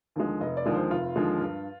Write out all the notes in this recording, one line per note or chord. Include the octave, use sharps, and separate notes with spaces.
D#2 D3 F3 G#3
F1 D#5
D5
D#2 D3 F3 G#3
C5
F1 F4
D#2 D3 F3 G#3
G2